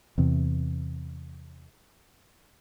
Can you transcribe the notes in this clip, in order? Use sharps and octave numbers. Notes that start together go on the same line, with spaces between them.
E2 C3